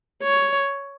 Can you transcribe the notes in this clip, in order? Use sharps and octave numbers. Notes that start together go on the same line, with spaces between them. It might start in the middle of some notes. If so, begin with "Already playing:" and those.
C#5